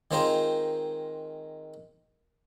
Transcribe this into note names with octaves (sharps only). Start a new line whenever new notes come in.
D#3 G#3 C4 F4 A#4 C5